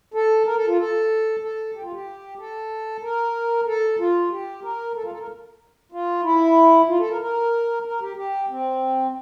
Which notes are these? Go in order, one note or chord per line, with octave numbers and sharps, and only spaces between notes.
A4
A#4
A4
F4
A4
A4
G4
F4
G4
A4
A#4
A4
F4
G4
A#4
A4
F4
A4
A#4
F4
E4
F4
A4
A#4
A#4
A#4
G4
G4
C4